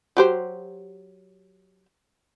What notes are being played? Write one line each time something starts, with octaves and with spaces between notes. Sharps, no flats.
F#3 G4 C5